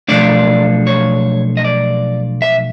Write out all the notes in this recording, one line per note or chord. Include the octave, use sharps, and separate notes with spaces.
B1 A#2 F3 A3 D4 D5
C#5
D#5
D5
E5